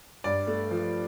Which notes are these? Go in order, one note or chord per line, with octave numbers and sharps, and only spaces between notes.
G2 D5
A3
F3